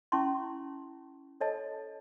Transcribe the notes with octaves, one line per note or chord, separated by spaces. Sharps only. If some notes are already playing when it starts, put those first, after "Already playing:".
C#4 E4 E5 A5 C6 C#6
A4 C#5 D#5 A5